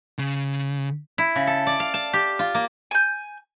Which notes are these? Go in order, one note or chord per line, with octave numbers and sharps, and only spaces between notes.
C#3
E4
C#3
A4
D5
F5
A5
G4
F4
A#3
G#5 G6